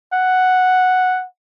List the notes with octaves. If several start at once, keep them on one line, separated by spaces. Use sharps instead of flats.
F#5